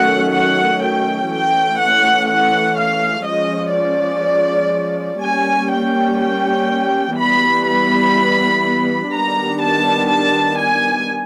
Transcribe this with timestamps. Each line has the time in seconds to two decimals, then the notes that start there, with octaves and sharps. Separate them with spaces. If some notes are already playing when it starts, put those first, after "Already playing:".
Already playing: D#3 F#3 A3 C#4 F#5
0.34 F#5
0.84 G5
1.32 E3 A3 C#4 G5
1.82 F#5
2.29 F#5
2.79 F5
3.27 F3 G#3 C#4 D#5
3.76 D5
5.22 G3 A#3 C#4 G#5
5.71 G5
6.21 G5
7.17 E3 G3 B3 B5
7.67 B5
9.13 D#3 G3 B3 D4 A#5
9.62 A5
10.10 A5
10.59 G#5